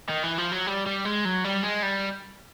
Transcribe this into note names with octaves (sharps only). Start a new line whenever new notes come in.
D#3
E3
F3
F#3
G3
G3
G#3
F#3
G3
G#3
G3